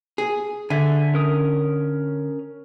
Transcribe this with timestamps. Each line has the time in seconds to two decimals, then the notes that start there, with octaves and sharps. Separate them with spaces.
0.18 G#4
0.70 D3 A4 E5 G#5
1.14 C#4 A#4 D#6